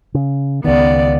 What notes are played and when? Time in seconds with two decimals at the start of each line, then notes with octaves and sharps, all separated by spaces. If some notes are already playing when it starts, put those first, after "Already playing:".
0.14 C#3
0.64 C#2 D#3 B3 D5